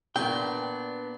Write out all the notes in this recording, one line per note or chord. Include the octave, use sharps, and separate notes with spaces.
A#2 B3 D4 G5 C#6